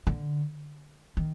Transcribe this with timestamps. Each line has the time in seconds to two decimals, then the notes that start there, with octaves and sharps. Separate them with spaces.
0.07 D3
1.17 D#3